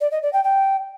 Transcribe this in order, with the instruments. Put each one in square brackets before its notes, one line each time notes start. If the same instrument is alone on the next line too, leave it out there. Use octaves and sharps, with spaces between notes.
[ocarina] D5
D#5
D5
G5
G5